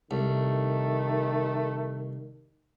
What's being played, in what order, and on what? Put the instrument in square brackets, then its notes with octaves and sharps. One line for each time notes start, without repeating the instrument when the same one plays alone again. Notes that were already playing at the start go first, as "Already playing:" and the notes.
[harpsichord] C2 [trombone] D#3 [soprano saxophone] A3